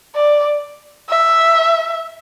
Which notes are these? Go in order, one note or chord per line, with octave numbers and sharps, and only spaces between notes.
D5
E5